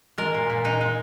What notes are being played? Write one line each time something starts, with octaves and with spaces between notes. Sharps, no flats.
G#3 A#4
A#2
A#2
G#3 D#4
G#3